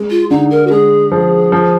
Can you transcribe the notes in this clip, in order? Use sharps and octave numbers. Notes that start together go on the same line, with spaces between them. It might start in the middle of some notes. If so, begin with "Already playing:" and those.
Already playing: G#3
F4
D3 D#4
A#4
F#4
G#3 G#4
F3
F3